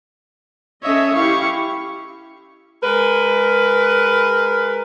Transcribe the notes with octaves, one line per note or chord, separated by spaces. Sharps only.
C#4 A4 C#5 D#5 E5
E4 G4 F5 C#6
G#3 A#4 B4